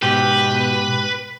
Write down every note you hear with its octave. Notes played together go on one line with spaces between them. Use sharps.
G#2 B2 G4 B4